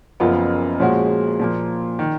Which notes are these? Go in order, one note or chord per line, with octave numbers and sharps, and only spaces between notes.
F#1 F#2 F3 B3 F4
A#2 F3 G#3 C#4 F#4
A#2 F3 A#3
D#3